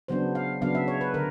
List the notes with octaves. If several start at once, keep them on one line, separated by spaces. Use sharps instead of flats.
C#3 F#3 B3 D4 C5
F5
C#3 F#3 B3 D4 F5
E5
C#5
B4
D3 A#4